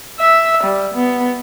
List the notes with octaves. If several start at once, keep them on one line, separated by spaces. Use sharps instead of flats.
E5
G3
B3